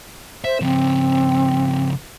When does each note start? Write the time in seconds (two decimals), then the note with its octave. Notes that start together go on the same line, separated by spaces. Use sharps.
0.44 C5 E5
0.61 C#3 F3 C4